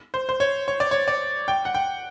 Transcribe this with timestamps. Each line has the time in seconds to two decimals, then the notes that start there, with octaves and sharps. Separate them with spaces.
0.14 C5
0.29 C5
0.40 C#5
0.68 C#5
0.80 D5
0.91 C#5
1.08 D5
1.48 G5
1.65 F#5
1.75 G5